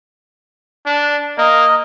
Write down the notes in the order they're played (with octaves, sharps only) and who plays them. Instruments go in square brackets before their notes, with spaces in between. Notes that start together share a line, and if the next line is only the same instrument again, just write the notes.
[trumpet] D4
[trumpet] A#3 [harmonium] D#5